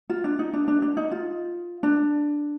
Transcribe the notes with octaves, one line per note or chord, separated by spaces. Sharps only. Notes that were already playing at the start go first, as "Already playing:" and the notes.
F4
D4
D#4
D4
D4
D4
D#4
F4
D4